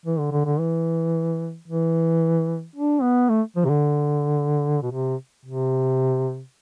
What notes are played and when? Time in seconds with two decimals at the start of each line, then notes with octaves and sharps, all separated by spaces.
0.06 E3
0.19 D3
0.32 D3
0.46 D3
0.59 E3
1.68 E3
2.76 D4
3.02 B3
3.29 A3
3.56 F3
3.65 C3
3.70 D3
4.82 B2
4.91 C3
5.45 C3